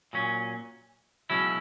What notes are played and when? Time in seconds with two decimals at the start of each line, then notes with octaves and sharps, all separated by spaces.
0.13 A#2 F#3 C#4
1.30 C#2 B2 F#3 C#4 E4